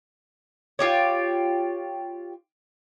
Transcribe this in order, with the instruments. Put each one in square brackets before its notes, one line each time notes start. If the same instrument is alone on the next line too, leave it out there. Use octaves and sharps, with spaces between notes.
[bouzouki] F4 G4 C#5